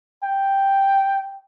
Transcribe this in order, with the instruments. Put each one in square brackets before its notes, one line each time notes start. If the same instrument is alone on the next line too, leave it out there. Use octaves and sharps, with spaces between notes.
[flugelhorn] G5